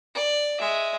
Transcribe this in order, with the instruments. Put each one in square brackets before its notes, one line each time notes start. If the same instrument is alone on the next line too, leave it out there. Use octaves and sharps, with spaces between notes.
[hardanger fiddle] D5
G#3 E5